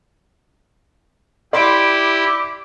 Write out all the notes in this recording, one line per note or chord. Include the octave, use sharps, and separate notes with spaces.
E4 G4 D5 B5 C6 D6